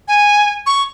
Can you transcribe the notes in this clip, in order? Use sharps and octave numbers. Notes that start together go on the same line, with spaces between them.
G#5
C#6